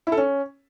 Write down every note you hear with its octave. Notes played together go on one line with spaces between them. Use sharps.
E4
A4
C#4